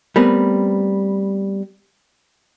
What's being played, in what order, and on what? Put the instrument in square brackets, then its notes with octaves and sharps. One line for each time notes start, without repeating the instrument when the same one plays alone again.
[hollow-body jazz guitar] G3 A3 B3 C4 A#4 B4